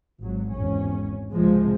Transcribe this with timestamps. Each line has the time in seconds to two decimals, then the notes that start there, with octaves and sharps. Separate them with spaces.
0.21 G#1 F#3
0.52 G#1 E2 C#4
1.33 C#2 C3 F3 G#3